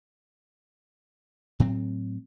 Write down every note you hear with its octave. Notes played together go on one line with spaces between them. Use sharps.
A2 F#3 C4